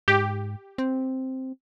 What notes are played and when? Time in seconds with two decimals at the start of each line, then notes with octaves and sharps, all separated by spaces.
0.08 G#2 G4
0.78 C4